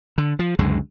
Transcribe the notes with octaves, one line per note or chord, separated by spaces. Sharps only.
D3
F3
C#2 F#2 D3 G#3